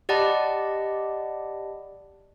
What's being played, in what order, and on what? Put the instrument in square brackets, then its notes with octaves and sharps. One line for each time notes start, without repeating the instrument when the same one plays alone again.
[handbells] G4 D5 D#5 F#5 A5 B5